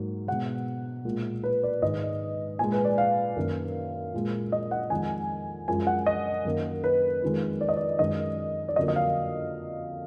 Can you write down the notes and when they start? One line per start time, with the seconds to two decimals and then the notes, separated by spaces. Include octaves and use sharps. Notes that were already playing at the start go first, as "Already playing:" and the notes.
Already playing: G#2 F#3 A#3
0.27 B2 G#3 F#5
1.05 A#2 G#3
1.43 B4
1.63 D5
1.82 G#2 D#3 G#3 D#5
2.59 A#2 G#5
2.64 G#3
2.72 B4
2.85 D5
2.98 F5
3.36 F#2 D#3 F#3 A#3
4.14 A#2 G#3
4.52 D#5
4.71 F#5
4.90 F2 D#3 G#3 G#5
5.68 F#2 F3 G#3 G#5
5.87 F#5
6.06 D#5
6.45 F#2 D#3 A#3
6.84 B4
7.22 F2 D#3 G#3
7.61 D5
7.69 D#5
7.77 D5
7.99 F#2 D#3 G#3 D#5
8.68 D5
8.76 F2 D3 F#3 A#3 D#5
8.88 D#5
8.96 F5